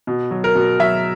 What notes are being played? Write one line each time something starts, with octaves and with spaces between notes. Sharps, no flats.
B2
F#3
A#4
B2
F#3 E5